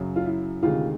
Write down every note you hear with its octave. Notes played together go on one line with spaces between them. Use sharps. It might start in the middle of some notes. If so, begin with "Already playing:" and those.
Already playing: F#2 C#3 F#3
F4
E4
D2 C3 D#3 G#3 F4